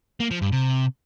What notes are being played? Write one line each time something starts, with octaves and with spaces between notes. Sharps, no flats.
A#3
F3
G2
C3